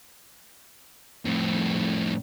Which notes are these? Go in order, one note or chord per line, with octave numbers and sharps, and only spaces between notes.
F2 A2